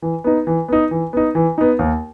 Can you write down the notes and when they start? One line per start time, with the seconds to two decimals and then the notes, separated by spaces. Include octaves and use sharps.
0.02 E3
0.24 B3 D#4
0.47 E3
0.68 B3 D#4
0.91 E3
1.13 B3 D#4
1.35 E3
1.58 B3 D#4
1.79 D#2